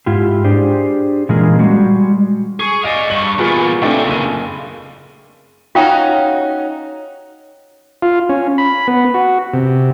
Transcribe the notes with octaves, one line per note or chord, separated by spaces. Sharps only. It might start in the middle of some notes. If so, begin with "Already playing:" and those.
G#2 E4 F4 G4
D4 G4 G#4 C5
A#2 E3 G#3 C#4 G#4 A#4
G3 G#3 F#4
G#4 C#6
D5 D#5 F5 D#7
G2 F#7
E2 A#2 F4 G#4 B4
A#2 C#3 A3 C4 D4
F#1 D#7
C#4 D#4 F4 F#4 F5 G5
F4
C#4
B5
B3
F#4
C3